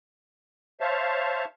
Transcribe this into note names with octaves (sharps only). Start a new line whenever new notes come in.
C5 C#5 E5 F5 A5